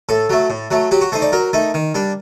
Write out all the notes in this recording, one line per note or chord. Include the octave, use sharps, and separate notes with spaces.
A2 A4
F#3 A3
A2
F#3 A3
F#3 G4
F#4
A3 D#4 C5
D5
F#3 A#4
A3 D#4
D#3
G3 D4